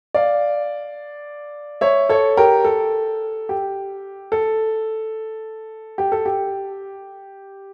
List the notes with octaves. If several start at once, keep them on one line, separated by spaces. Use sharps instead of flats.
D5 F5
C#5 E5
A4 C#5
G4 A#4
A4
G4
A4
G4
A4
G4